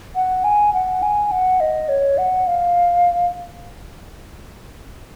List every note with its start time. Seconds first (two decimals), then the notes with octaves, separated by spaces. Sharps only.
0.15 F#5
0.44 G#5
0.74 F#5
1.02 G#5
1.32 F#5
1.60 D#5
1.89 C#5
2.18 F#5
2.47 F5